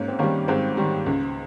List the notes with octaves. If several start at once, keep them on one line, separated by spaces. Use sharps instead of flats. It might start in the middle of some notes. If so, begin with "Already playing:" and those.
Already playing: G#2 A#3 C#4
C4
D#3 G3 A#3 C#4
G#2 G#3 C4
D#3 G3
C#2